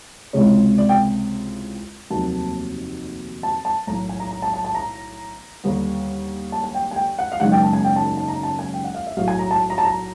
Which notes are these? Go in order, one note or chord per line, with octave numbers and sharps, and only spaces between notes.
C#2 C3 E3 G#3 C#5
D5
G5
F1 D#2 D#3 F#3 A#3 A5
A5
A5
B1 A2 E3 A#5
G#5
A#5
A#5
A5
A5
A5
A#5
D#2 D3 G3 B3
A5
G#5
G5
G#5
G5
F#5
F5
F#1 F#2 D#3 G#3 F#5
G5
A5
G#5
G5
A5
A5
A5
A#5
A5
G#5
G5
F#5
F5
E5
B1 A2 F#3 F5
G#5
A#5
A5
A#5
A5
A#5